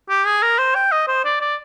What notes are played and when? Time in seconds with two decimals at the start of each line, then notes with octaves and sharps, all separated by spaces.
0.09 G4
0.26 G#4
0.43 A#4
0.59 C5
0.75 G5
0.92 D#5
1.08 C5
1.25 D5
1.41 D5